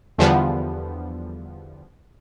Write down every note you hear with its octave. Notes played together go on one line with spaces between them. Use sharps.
E2 D3 F3 G3 B3